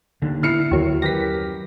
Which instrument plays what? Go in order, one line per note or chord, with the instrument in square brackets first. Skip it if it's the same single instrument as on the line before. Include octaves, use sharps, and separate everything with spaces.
[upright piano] D#2 [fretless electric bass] D3
[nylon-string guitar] B3 E4 [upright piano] F6 C7 C#7
[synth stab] D#2 F#3
[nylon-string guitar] F#2 [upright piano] G4 A#4 B4 [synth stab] A#6 B6